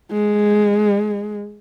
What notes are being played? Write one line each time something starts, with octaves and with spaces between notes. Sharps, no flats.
G#3